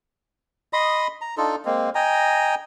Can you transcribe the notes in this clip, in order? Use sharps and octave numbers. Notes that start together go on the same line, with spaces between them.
D#5 B5 C6 D#6
A#5
D4 D#4 F4 A4
G#3 A#3 C4
D#5 G5 G#5 A#5